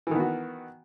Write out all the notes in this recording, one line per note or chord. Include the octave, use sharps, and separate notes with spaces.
D#3 E3 B3 F#4